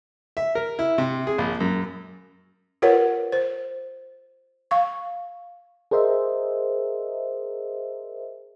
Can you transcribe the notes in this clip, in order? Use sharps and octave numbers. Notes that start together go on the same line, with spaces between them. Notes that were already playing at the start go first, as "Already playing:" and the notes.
E5
A#4
E4
C3
G#4
A#1
F#2
F4 G4 A#4 B4 C#5 F#5
C5
F5 C#6
G#4 A#4 C5 D#5 E5